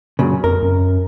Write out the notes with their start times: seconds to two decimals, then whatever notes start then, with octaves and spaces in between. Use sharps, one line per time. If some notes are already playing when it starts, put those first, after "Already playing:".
0.19 F#2 A#2 C#3
0.44 F2 A#4
0.62 F#2